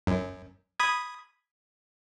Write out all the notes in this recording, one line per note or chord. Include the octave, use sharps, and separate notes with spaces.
F#2
B5 D#6 G#6